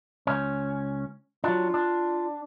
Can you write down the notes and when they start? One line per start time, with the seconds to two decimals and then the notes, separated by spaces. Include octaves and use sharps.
0.27 C#2 C#4
1.44 F#3 D4 F4
1.74 D4